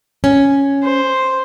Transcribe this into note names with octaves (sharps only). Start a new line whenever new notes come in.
C#4
C5